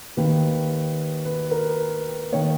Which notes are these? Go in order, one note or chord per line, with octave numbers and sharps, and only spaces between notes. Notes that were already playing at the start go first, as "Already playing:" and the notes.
D#2 D#3 A#3 B4
B4
A#4
D#3 A#3 C#5